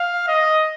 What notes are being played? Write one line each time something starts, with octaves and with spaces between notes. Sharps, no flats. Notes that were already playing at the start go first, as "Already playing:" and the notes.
Already playing: F5
D#5